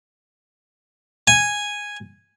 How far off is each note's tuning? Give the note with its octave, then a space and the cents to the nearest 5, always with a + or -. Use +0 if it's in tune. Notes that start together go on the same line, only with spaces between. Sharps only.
G#5 -5